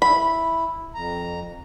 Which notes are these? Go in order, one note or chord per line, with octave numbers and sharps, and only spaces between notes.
E4 B5
F2 A#5